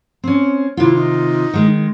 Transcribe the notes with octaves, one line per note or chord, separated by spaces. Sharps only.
C4 C#4
C3 D#3 E4 F4
D#4
D#3 G#3